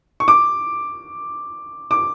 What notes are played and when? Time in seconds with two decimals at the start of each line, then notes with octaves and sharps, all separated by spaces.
0.20 C#6
0.28 D6
1.91 D6